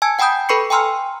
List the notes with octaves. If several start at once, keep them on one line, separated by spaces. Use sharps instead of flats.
G#5 A5 E6 G#6
F#5 G5 A5 B5 D#6 G6
A4 B4 B5 C#6 C7 C#7
G5 G#5 A#5 C6 E6 F6